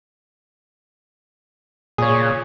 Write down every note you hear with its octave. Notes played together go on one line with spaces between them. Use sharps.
A#2 G#4 C#5